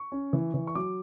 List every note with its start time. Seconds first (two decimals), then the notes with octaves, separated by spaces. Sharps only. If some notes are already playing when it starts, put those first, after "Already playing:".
Already playing: C#6
0.12 C#4
0.33 E3
0.54 E3
0.67 C#6
0.75 F#3 D6